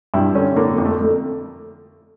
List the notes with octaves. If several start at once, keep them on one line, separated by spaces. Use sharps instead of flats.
G2 E4
D3 C#4
D3 A#3
F2
A3
A3